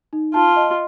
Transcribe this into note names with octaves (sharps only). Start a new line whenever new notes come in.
D#4
F4 A5
D#5